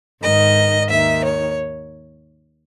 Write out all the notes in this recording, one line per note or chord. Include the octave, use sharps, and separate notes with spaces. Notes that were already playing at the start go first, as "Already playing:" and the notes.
G#2 D#3 D#5
D#2 D#3 E5
C#5